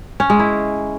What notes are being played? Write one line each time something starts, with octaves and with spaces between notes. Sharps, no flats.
C#4
G#3
E4